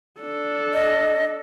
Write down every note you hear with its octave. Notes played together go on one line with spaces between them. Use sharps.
D4 A4
D#5